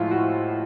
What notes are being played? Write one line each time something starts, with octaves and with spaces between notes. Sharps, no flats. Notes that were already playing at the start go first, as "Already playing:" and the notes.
Already playing: A2 F3 G#3 E4 F4
F#4